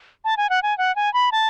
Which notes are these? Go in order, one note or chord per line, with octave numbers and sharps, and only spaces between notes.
A5
G#5
F#5
G#5
F#5
G#5
B5
A5